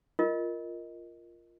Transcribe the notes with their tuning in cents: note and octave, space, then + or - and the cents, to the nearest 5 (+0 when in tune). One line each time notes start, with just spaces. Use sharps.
F4 -10 A#4 +0 D#5 +5